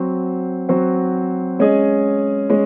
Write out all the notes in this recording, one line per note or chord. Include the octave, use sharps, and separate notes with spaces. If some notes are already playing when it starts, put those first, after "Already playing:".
Already playing: F#3 C4 F#4 C5
F#3 C4 F#4 C5
G#3 C#4 G#4 D#5
G#3 C#4